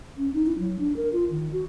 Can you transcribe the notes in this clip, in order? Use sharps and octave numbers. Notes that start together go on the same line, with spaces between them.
C#4
D#4
E4
F#3
D4
A#4
F4
D#3
F#4